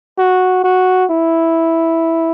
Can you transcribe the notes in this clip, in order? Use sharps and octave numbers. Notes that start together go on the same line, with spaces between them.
F#4
F#4
E4